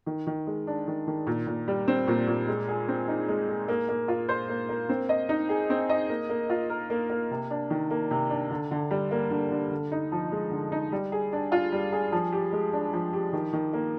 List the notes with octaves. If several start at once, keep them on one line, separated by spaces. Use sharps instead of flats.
D#3
D#3
G#3
D4
D#3
D#3
A#2
A#2
G3
C4
A#2
A#2
G#3
G#4
C4
D#4
G#3
G#4
A#3
A#3
F4
C5
A#3
A#3
C4
D#5
D#4
G#4
C4
D#5
A#3
A#3
F4
A#4
A#3
A#3
C3
D4
D#3
A#3
C3
D4
D3
D3
G3
A#3
D3
D3
D3
D#4
F3
G#3
D3
D#4
G3
G#4
D4
F4
G3
G#4
F3
G4
G#3
D4
F3
G4
D#3
D#3
A#3